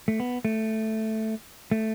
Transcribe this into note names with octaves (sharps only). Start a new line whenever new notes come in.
A3
B3
A3
A3